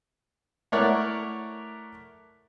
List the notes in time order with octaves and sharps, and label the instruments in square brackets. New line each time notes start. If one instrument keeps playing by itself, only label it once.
[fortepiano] A3 E4 A#4 C#5 D5 F#5